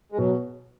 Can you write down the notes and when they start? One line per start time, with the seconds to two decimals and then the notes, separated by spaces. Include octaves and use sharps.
0.12 G#3
0.18 B2 F#3